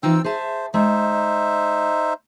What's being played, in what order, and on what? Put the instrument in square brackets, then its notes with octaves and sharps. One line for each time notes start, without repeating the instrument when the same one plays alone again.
[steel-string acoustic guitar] E3 D#4 F4 [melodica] C4 G5 E6
[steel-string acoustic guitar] G#4 E5 A5 [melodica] C5
[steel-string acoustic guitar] G#3 [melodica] D#4 C5 E5